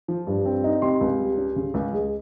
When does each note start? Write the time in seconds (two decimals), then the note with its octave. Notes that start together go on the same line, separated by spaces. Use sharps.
0.08 F3
0.27 G2
0.45 C4
0.64 D#4
0.82 C3 C6
1.01 C#2
1.19 G3
1.37 C#4
1.56 C#3
1.74 C#2
1.93 G#3